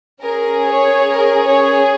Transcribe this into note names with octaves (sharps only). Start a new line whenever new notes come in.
C#4 G#4 A#4
C#5
A#4
C#5